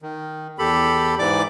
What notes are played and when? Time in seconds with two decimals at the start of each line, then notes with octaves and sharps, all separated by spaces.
0.02 D#3
0.59 E2 G4 A4 B5
1.19 G#2 E3 D5 D6